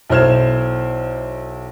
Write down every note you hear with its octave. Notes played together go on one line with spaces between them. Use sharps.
B1 E4 C5 F6 G#6 E7